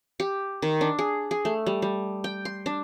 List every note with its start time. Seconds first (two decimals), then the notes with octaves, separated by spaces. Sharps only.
0.20 G4
0.62 D#3
0.81 D4
0.99 G#4
1.31 G#4
1.45 A3
1.66 G3
1.82 G3
2.24 G5
2.45 C6
2.66 D4